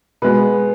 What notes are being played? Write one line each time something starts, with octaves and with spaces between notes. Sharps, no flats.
B2 G#3 B3 B4